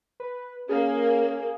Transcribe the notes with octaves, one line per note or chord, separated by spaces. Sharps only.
B4
A#3 C#4 G#4